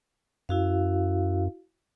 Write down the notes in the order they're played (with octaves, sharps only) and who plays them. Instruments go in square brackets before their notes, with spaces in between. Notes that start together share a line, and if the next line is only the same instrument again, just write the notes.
[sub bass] F#2 [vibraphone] E4 F#4 F5